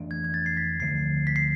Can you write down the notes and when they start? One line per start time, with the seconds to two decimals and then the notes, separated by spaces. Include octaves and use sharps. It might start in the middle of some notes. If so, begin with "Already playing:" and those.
Already playing: F2 E3 A3 D4
0.11 G#6
0.24 G#6
0.34 A6
0.46 C7
0.57 B6
0.80 D2 D3 F3 A3 C7
1.27 B6
1.36 C7